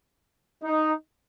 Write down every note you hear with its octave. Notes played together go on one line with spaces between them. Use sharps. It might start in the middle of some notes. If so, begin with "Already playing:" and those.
D#4